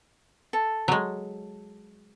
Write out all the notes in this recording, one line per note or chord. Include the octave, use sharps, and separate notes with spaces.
A4
F#3 G#3